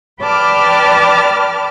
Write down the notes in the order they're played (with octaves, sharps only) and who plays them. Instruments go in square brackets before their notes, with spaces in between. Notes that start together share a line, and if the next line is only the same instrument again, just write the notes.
[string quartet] B4 D5 G5 A5 D6 F6